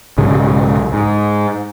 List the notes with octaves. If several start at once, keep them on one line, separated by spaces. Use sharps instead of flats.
B1 G#2 C#3 G#3
G#2